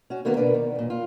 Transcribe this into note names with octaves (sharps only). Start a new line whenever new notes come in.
C#4 F#4
D3 D#3 A#3 B3 F#4 A#4
B2 B3 D4 A#4 B4 D5
D#3
F#2 A#2
F4